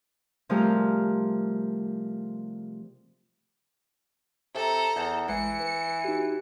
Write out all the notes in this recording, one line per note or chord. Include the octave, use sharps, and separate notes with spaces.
C3 F3 G3 A3 G#4 A#4
C3 A4 A#5
E2 E4
A1 E3 G#3 C7 C#7
B4
D#4 F#4 G4